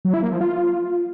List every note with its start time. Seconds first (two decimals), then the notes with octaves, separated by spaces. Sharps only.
0.05 F#3
0.14 E4
0.23 A#3
0.32 F3
0.41 F4